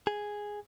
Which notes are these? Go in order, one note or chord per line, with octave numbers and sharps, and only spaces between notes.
G#4